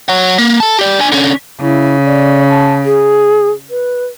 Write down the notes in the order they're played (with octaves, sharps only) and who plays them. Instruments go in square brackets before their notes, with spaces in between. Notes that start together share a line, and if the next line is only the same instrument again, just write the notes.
[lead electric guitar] C#5 F#5
A#3
A4 A5
G4 D5
D4 G#5
D3 C#4
[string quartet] C#3 [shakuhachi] E4
[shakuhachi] D5
A5
G#4
B4